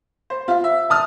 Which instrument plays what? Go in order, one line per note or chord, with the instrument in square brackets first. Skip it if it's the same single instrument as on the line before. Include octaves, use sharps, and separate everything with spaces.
[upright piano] C5
F4 F5
E5
A5 D#6 F6